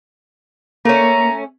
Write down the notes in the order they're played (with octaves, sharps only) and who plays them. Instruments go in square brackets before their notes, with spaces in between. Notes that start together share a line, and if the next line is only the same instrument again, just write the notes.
[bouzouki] A3 C#4 [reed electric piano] A#3 [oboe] A#5